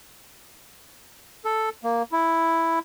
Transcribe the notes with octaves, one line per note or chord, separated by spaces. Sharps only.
A4
A#3
E4